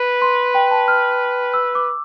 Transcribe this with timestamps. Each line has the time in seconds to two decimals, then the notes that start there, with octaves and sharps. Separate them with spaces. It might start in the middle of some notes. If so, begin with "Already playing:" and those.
Already playing: B4
0.22 C6
0.55 G5
0.71 A5
0.88 F6
1.54 E6
1.75 D6